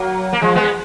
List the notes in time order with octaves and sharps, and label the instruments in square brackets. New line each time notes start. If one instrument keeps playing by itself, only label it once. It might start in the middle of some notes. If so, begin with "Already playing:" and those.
Already playing: [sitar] F#3 A#3
A#3
F3 G#3
G#3 B3